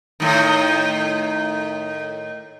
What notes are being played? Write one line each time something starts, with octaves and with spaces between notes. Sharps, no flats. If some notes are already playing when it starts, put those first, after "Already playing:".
A2 D#3